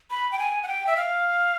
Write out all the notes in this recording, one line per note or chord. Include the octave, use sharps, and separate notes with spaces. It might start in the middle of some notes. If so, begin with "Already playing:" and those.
B5
G5
G#5
F#5
G5
E5
F5